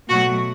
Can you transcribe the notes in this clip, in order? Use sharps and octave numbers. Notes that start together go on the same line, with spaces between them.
B2 F#3 A3 F#4 F#5